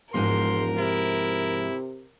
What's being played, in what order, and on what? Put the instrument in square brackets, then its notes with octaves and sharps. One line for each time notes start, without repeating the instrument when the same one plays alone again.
[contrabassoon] E1 [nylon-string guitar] G#2 F3 A#3 [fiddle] A#4 [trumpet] C6
[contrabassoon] C3 [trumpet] E4